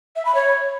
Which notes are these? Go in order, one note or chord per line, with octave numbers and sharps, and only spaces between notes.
E5
B5
C#5